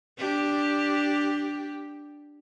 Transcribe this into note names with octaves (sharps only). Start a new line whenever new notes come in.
D4 G4